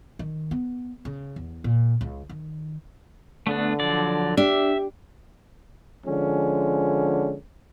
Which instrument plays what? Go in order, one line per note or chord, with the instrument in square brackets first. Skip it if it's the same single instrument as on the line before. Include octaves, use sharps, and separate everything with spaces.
[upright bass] D#3
B3
C#3
E2
A#2
C#2
D#3
[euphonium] D3 [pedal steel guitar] A3 B3 D4
[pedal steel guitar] F3 F#3 D5
[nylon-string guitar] D4 [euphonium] G4 [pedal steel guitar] E5
[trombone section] D3 F3 G#3 C#4